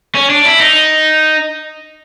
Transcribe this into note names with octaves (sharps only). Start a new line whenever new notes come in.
C#4
D4
E4
D#4